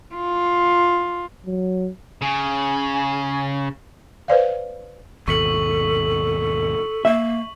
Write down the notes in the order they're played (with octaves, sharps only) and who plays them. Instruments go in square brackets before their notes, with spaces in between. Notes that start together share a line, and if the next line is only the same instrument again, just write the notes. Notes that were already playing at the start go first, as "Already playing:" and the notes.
[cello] F4
[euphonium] F#3
[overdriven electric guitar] C#3 [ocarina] G#5
[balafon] B4 C5 D5 F5
[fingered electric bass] G#1 D#2 B2 [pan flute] A4 [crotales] C#6 B6 F#7
[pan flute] A#3 [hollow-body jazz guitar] E5